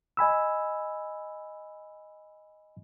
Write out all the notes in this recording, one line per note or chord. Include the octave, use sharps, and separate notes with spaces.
D#5 G#5 B5 E6